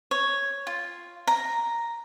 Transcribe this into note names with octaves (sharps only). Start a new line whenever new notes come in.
C#5
F4
A#5